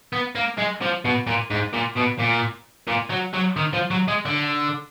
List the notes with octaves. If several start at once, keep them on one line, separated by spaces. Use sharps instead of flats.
B3
A#3
G#3
F3
B2
A#2
G#2
A#2
B2
A#2
A#2
F#3
F#3
D#3
F3
F#3
G#3
D3